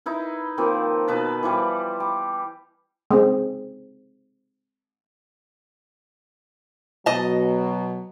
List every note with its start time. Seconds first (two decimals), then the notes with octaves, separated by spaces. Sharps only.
0.06 D#4 E4 B4
0.57 D#3 F3 A#3 C4
1.08 B2 D#4 B4 A5
1.43 E3 F3 G3
2.00 G4
3.11 G#3 C4
7.06 B2 F#3 D#5 A5